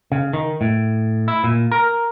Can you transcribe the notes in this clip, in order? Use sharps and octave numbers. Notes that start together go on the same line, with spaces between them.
C#3
D#3
A2
E4
A#2
A#4